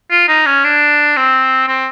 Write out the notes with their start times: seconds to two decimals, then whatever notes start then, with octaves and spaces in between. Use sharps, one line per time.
0.11 F4
0.28 D#4
0.46 C#4
0.64 D4
1.16 C4
1.68 C4